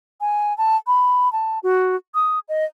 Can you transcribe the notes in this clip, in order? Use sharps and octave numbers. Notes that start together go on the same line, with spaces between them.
G#5
A5
B5
A5
F#4
D#6
D#5